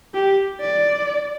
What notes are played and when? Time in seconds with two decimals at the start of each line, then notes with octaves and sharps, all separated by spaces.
0.14 G4
0.60 D5